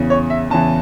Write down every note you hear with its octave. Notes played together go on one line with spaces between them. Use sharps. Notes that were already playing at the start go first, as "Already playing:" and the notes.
Already playing: E2 C#3 E3
C#5
E5
E2 C#3 E3 A5